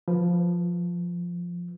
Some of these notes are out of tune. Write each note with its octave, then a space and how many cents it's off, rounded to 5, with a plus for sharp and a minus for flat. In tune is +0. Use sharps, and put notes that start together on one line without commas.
F3 +0 B4 +0